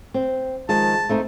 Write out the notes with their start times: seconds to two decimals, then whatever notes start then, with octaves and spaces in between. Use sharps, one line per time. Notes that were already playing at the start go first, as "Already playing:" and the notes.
0.14 C4
0.69 D#3 F3 G#3 A5
1.09 A3 C4 D#4